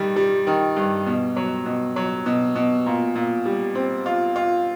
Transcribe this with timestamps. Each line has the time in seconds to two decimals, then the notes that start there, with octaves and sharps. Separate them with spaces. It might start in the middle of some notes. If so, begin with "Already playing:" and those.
Already playing: G2 D#3 G3
0.16 G3
0.47 D#3
0.76 G2
1.06 B2
1.36 F#3
1.66 B2
1.96 F#3
2.26 B2
2.55 B2
2.86 A#2
3.15 A#2
3.46 G3
3.75 C4
4.06 F4
4.36 F4